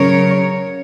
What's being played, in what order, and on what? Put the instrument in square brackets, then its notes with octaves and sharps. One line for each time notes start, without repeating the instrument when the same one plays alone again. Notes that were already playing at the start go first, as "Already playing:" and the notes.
Already playing: [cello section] C#3 F#3 A#4 C#5